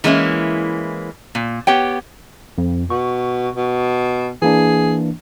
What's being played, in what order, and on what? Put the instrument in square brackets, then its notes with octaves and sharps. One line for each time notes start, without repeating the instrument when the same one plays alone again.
[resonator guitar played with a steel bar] E3 G#3 A#3 C#4 E4
A#2
B3 G4 C#5 G5
[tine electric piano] F2
[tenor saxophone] B2 [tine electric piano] C#6
[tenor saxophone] B2
[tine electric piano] E3 A#3 D4 [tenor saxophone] G#4